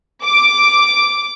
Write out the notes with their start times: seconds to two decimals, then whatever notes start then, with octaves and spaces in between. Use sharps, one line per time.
0.24 D6